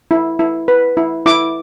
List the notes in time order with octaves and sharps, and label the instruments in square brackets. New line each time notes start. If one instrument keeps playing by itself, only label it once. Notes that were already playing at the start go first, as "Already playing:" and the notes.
[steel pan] E4
E4
B4
E4
E4 D6